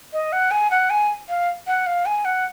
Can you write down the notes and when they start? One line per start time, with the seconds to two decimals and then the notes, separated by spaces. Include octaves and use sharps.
0.13 D#5
0.33 F#5
0.51 G#5
0.71 F#5
0.90 G#5
1.29 F5
1.67 F#5
1.86 F5
2.06 G#5
2.25 F#5